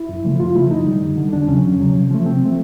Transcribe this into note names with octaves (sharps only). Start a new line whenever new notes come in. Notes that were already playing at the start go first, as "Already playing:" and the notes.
Already playing: E4
F#2
C#3 F3 A3
F#2 F4
C#3 F3 A3 E4
F#2 D#4
D3 G3
F#2
D3 G3
E2 D4
C#3 F#3 C#4
E2
C#3 F#3
C3
F3 A3
C3 C4
F3 A3